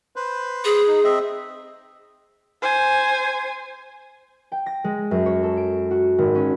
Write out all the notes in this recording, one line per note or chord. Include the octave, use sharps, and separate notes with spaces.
B4 C5
G#4
D#4
C4 D#5 E5
C5 G#5
G5
A#6
G#3
F#2
C#5
A4
D7
F#4
G#1
C#4